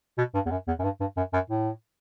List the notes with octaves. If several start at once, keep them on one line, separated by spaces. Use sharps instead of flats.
B2
G2
E2
F#2
E2
F#2
G2
G2
F#2
F#2
A2